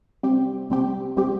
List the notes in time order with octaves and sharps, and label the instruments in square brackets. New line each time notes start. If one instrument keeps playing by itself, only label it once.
[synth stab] C3 G3 C4 G4
C3 G3 C4 G4
C3 G3 C4 G4